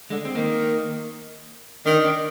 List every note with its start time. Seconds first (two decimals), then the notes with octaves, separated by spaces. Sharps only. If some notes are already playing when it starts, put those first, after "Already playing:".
0.10 D3 G#3
0.25 C4
0.35 D#3 A#3
1.86 D#3 D4
2.05 D4